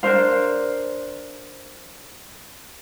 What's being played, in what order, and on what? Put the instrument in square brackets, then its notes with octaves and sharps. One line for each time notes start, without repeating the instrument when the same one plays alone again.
[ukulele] D4 A#4 C5 F5